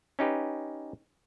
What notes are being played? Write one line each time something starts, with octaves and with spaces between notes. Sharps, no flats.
C#4 D#4 G4 B4